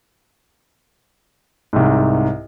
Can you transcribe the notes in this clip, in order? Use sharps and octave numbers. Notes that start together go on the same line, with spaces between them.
C2 G#2